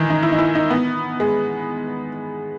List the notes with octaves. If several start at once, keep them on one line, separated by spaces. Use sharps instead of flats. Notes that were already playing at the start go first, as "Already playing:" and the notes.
Already playing: D#3 E3
D#4
E4
D#4
E4
D#4
B3
G#3